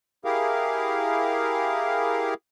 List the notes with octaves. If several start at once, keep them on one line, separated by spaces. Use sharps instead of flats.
E4 G4 G#4 A#4 F5